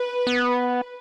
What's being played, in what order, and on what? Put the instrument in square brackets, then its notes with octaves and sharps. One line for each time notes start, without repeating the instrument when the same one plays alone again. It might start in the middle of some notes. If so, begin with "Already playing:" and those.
Already playing: [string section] B4
[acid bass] B3